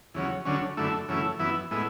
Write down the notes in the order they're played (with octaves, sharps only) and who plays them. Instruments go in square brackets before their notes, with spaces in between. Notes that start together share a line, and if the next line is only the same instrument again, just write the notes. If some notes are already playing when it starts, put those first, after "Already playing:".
[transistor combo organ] E2 C#3 F#3
D2 D3 F#3 C#4
F#2 D3 A3 E4
F#2 C#3 E3 A3 E4
F#2 E3 B3 E4
A2 G#3 B3 E4